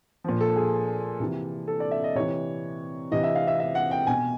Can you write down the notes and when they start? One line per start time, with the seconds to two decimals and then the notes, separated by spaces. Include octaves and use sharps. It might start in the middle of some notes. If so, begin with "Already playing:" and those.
0.24 A#2 F3
0.41 A4
0.56 G#4
1.20 C3 E3
1.68 A4
1.80 D5
1.91 E5
2.04 D#5
2.15 C3 E3 C#5
3.11 C3 E3 D#5
3.23 E5
3.35 F5
3.47 E5
3.60 E5
3.75 F#5
3.91 G5
4.07 B2 G#5